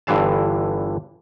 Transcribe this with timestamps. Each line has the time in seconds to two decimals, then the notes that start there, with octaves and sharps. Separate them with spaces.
0.07 G1 G2 D3 E3 F5 A5